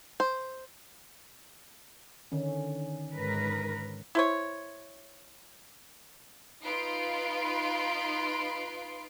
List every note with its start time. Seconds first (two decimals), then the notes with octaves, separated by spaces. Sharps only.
0.20 C5
2.32 D3 D#3 C#4
3.14 G#2 A#4 B4
4.15 E4 C5 C#5
6.63 D#4 F4 B4 C6 D7